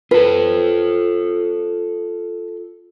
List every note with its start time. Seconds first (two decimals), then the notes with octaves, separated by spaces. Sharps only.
0.11 F4 A4 B4